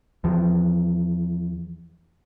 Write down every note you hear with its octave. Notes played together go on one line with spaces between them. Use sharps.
E2 F3